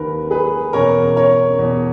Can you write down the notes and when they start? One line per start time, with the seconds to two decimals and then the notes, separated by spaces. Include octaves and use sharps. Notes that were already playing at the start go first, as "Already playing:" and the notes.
Already playing: D#2 D#3 A#4 B4
0.31 G#4 B4
0.73 E2 B2 A#4 C#5
1.16 A#4 C#5
1.59 E2 B2